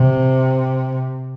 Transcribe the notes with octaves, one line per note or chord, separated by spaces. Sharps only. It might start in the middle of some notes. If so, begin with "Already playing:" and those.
Already playing: C3